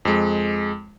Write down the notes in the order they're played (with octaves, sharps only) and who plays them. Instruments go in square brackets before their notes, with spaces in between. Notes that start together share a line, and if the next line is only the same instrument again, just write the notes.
[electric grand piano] F2 G#3